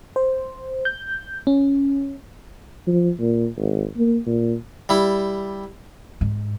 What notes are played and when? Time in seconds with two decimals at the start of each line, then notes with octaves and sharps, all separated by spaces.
0.16 C5
0.85 G6
1.47 C#4
2.87 F3
3.20 A#2
3.57 G#1
3.97 A#3
4.27 A#2
4.89 G3 E4
6.21 G#2